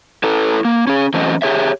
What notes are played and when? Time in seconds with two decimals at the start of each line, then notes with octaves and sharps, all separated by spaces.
0.24 E4 A4 B4
0.65 A#3
0.87 C#4 G#4
1.14 E3 F#3 A3 C4 C#4 D#5
1.42 G4 G#4 C#5 E5